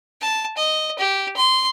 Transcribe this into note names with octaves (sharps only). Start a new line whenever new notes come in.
A5
D#5
G4
C6